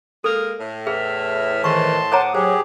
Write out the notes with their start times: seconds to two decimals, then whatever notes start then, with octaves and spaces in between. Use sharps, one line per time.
0.24 G#3 A#3 A4 A#4
0.60 A2
0.87 E2 G#4 E5 F6
1.64 G#2 D#3 E3 A5 C6 C#6
2.12 C5 C#5 F#5 A#5 D6 D#6
2.35 F#3 G4 G#4 C5